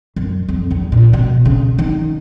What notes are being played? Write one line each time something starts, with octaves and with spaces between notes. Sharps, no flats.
F#2
F2
E2
A#2
B2
C#3
D#3